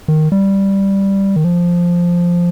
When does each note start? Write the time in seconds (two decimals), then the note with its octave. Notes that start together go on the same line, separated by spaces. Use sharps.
0.08 D#3
0.32 G3
1.36 D#3
1.44 F3